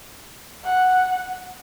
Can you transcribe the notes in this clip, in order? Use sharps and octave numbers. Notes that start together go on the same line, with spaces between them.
F#5